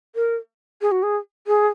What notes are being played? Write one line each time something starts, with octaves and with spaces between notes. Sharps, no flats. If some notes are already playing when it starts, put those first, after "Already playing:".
A#4
G#4
F#4
G#4
G#4